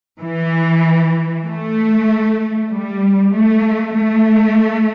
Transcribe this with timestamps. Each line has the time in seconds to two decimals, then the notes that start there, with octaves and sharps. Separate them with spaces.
0.20 E3
1.46 A3
2.72 G3
3.34 A3
3.96 A3